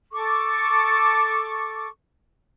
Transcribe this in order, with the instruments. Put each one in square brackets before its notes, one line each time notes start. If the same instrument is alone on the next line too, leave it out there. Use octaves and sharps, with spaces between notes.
[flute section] A4 C#6 D6